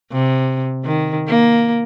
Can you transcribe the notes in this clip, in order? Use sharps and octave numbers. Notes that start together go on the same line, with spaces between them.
C3
D#3
A#3